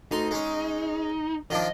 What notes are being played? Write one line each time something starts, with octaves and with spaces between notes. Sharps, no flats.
D2 D#4 C6
G#3 C#4
D#3 F3 D4 D#5